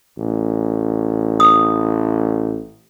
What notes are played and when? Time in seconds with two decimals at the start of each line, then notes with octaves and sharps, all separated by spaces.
0.18 A1
1.40 D#6